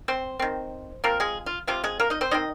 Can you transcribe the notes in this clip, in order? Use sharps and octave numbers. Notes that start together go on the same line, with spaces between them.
C4 C5
D#3 C4
F3 A#3 C4 A#4
G#3 G#4
F4
C3 F3 C4 F4
G#3 G#4
A#3 A#4
D#4 D#5
C4 C5
D#3 C4 D#4 D#5